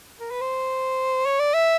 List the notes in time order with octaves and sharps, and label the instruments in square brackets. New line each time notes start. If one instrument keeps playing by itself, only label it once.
[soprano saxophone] A#4
B4
C5
C#5
D5
E5